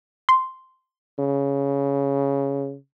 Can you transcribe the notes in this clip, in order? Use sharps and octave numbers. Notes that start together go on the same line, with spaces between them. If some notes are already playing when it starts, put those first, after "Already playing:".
C6
C#3